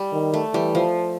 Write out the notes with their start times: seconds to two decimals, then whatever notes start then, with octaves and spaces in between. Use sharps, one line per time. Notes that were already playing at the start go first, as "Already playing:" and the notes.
Already playing: G3
0.13 D#3
0.34 A3
0.54 E3 G3
0.75 F3